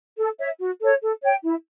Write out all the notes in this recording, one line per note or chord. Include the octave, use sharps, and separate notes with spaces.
A4
C#5 E5
F#4
A4 C#5
A4
C#5 G5
E4